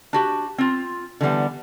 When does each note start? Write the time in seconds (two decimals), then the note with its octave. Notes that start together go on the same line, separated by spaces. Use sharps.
0.13 D4 F#4 G4
0.58 C4 F4
1.21 D3 E3 G3 B3